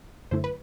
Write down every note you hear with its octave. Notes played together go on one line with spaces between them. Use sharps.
F#2 D3 A3 E4 C5
B4